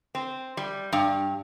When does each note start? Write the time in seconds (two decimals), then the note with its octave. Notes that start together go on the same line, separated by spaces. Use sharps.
0.15 C4
0.57 G3
0.92 G2